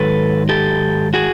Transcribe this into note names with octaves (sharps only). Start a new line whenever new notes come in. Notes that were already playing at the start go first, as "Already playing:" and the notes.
Already playing: G#2 D#3 F#3 A4 B4
G4 A4
F#4 G#4